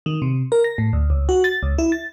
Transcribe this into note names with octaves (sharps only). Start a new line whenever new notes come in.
D#3
C3
A#4
A#6
A2
D2
C#2
F#4
A6
C#2
E4
A6